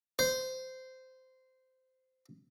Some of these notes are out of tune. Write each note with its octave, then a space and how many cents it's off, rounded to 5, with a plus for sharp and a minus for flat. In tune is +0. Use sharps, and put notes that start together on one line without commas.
C5 -15